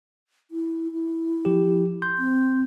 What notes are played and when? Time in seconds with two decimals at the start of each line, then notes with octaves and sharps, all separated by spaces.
0.51 E4
0.92 E4
1.45 F3 G4
2.02 C6 G6
2.18 C4